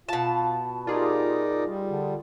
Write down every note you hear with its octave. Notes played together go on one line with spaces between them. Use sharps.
B2 F4 A5
D#4 F4 G4 G#4 A#4 D5
G3
D3